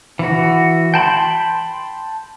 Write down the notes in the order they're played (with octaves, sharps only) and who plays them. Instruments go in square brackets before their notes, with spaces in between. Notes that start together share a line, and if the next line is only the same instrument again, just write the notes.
[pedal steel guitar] E3 F#4
G5 A5 B5 C6